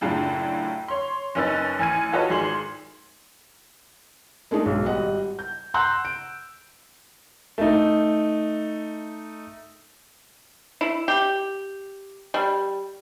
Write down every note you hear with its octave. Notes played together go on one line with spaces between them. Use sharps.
F#2 A2 C#3 D4 F4
C#5 C6
F#1 C#4 D#4 B4 E6 A6
A1 G#5 F6 G#6 D#7
F4 F#4 A4 B4 C#5 D#5
G#1 G#4 C6 F#7
G#3 A3 D4 D#4
B1 G#2
G#1 G3 D#5 F#5
G6
F#5 A#5 C6 E6 F#6 G6
D7
A3 D#4
E4
G4
G3